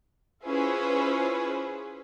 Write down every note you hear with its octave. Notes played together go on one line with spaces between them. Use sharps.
C#4 E4 F4 G#4 B4 C5